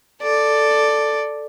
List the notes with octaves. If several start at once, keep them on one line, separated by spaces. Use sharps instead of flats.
A4 D5